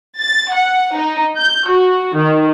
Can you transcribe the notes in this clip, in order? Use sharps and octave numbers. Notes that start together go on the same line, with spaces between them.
A6
F#5
D#4
G6
F#4
D#3